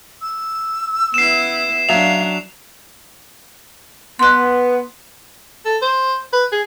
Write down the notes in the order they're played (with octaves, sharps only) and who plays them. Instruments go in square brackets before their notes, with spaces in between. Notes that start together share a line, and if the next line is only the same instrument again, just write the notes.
[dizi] E6
[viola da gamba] B3 E4 [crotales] C7 E7
[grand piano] F#3 E5 [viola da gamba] D4 [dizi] F5 [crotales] F7
[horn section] B3 [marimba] C6 F#6
[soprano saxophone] A4
C5
B4
G#4